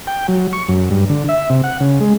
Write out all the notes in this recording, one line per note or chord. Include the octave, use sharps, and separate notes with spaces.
G5
F#3
C#6
F#2
G2
D3
E5
C3
F#5
C#3
G#3